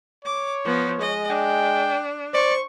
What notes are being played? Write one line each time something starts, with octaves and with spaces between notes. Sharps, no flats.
C#5 D6
F3 B3
G#3 D#5
D4 G5
C5 D5 C#6